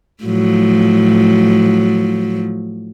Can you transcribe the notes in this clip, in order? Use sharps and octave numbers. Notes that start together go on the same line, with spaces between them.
A2 F3 F#3